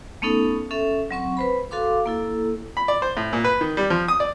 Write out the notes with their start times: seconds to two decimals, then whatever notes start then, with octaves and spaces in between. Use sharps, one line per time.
0.22 A3 B3 C#4 D#4 A4
0.71 C#4 A4 E5
1.11 F#3 C4 C#6
1.37 B4 C5 B5
1.71 F#4 A4 F5 C6 D6
2.06 A#3 E4 A4
2.77 B5
2.88 D5
3.02 C5
3.17 A2
3.33 A#2
3.44 B4
3.61 D#3
3.77 G3
3.90 F3
4.08 D#6
4.20 D5